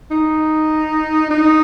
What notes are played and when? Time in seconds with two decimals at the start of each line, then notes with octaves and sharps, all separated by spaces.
0.11 D#4
1.30 D#4